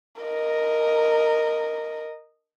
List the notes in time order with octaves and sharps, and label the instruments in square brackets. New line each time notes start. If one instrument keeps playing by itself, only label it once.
[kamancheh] A#4 D#5